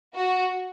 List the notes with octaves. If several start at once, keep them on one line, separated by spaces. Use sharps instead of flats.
F#4